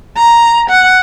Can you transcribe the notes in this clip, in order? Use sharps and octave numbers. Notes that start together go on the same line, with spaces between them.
A#5
F#5